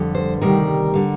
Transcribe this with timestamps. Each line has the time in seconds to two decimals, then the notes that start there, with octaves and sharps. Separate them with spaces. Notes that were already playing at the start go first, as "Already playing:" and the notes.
Already playing: F2 D3 G3
0.15 C5
0.41 D2 C3 D#3 G3 A#4
0.94 D3 G3